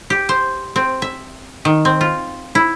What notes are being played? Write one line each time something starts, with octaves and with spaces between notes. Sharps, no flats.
G4
C5
C4
E5
D#3
C4
F4
E4